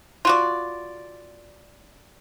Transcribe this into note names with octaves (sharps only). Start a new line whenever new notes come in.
F4 F#4 D5